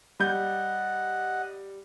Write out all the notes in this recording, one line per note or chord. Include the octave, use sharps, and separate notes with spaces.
G3 D#5 F#5 G6